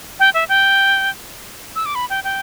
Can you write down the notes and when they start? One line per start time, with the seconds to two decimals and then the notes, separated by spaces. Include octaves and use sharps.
0.20 G5
0.34 E5
0.49 G5
1.76 E6
1.86 D6
1.95 B5
2.10 G5
2.24 G5